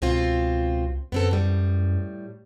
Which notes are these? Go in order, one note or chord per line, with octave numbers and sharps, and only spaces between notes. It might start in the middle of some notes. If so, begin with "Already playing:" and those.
C#2 B2 C4 F4
F#2 B3 C4 A4
A2 G3